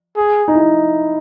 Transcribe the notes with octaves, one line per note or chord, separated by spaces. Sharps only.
G#4
D#4
E4